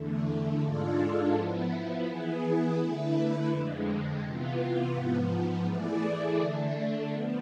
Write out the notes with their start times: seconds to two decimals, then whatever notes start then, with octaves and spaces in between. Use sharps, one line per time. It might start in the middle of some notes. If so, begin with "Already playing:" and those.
Already playing: E2 D3 A3
0.62 G#2 G#3 D4 F4 A4
1.34 F3 B3 E4
2.06 E3 B3 E4 G#4
2.78 D3 A3 E4 B4
3.50 F2 D3 G#3
4.22 C3 E3 B3 F4
4.93 G#2 F3 B3
5.66 E3 A3 E4 G#4 D5
6.38 D3 A3 D4
7.10 F3 B3